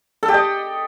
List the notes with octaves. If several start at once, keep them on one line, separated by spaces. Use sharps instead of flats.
A4
G4
D#5